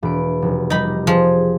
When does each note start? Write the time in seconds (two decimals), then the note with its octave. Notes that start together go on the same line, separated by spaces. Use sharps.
0.03 E1 B5 D7
0.42 F1
0.70 G3 D#4 B5 A#6
1.07 F3 G#4